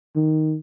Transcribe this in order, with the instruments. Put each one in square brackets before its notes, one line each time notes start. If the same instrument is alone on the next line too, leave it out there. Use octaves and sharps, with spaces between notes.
[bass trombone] D#3